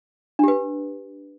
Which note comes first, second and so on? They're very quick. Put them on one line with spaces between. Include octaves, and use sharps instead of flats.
D4 G4 B4